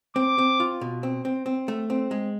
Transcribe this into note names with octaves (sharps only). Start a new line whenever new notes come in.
C4 D6
C4
F4
B2
C4
C4
C4
A3
C4
G#3